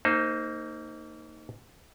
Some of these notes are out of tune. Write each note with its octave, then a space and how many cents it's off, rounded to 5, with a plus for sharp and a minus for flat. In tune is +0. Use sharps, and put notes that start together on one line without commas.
A#3 -30 D#4 +0 C5 +0